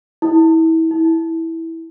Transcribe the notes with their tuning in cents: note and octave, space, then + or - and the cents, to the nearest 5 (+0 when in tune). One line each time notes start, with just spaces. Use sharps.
E4 -30
E4 -10